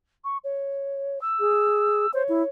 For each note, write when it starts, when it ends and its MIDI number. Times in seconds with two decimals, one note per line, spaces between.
0.24 0.37 85
0.44 1.19 73
1.21 2.11 88
1.40 2.06 68
2.14 2.23 72
2.14 2.49 73
2.29 2.43 64